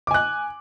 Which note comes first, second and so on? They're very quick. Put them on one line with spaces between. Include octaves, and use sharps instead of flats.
D6 G#5 F#6